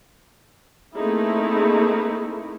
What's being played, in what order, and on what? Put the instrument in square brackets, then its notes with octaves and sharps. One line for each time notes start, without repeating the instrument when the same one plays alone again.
[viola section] A3 A#3 C4 D#4 E4 G#4